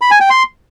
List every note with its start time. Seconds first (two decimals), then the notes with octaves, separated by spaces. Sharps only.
0.01 B5
0.11 G#5
0.21 G5
0.30 C6